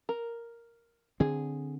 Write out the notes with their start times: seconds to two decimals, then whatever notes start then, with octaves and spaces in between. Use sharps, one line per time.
0.09 A#4
1.20 D3 C4 G#4